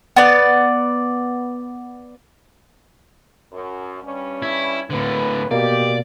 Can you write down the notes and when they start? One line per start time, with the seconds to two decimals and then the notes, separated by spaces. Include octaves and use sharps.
0.16 B3 D5
3.51 F#2
4.02 G2 G3 C#4
4.42 E4 G#6
4.90 D#2 A2 D3 B3 B4
5.51 B2 A#3 B3 G4 D5